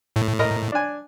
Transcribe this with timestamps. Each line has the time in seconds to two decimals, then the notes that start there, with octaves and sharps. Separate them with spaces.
0.16 A2
0.39 A#4 D#5 A#5
0.72 D4 G#5